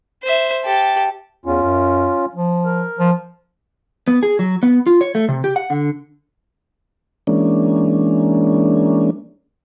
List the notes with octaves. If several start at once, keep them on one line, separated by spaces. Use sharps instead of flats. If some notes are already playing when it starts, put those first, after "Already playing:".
C5 E5
G4 A4
E2 C#4 F4
F#2
F3
A#4
F3
B3
G#4
F#3
B3
F4
C#5
A3
C3
G4
F#5
D3
E3 G#3 A#3 C#4 D4